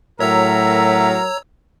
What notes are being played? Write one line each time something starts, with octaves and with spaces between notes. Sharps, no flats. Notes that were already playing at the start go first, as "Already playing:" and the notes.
A2 F#3 A#4 C#5 E5 A#5 E6